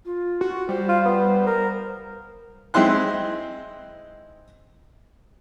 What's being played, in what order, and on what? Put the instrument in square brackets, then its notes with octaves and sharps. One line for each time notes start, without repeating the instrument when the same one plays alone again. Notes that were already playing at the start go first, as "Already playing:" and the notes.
[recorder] F4
[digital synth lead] F#4
[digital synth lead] G3 [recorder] C5
[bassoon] F4
B3
A#4
[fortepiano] G#3 C4 D#4 E4 C6 F#6